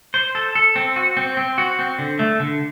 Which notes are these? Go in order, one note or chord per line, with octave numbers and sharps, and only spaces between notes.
C5
A4
A4
C4
F#4
C4
C4
F#4
C4
D3
A3
D3